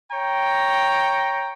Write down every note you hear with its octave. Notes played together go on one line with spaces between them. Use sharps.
C#5 G5 A#5